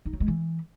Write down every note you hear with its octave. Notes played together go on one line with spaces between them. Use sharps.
D#4
F#3
G#3
E3